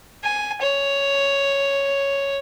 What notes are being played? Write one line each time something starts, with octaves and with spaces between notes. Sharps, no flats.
G#5
C#5